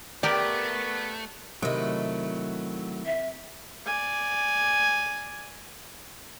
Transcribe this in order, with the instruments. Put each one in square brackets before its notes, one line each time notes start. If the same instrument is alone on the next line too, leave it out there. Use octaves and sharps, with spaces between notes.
[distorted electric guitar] A3 [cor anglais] B3 [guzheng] G4 A#4 [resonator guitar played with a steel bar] D5
[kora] C3 D#5 [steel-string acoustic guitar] D#3 E4 [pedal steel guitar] F#3 A3
[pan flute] E5
[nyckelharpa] D5 G#5